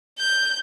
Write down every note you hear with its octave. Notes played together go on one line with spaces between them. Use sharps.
G6